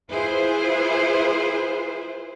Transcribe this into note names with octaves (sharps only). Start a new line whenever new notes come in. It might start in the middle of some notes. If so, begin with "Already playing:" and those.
E4 F4 G#4 B4 C5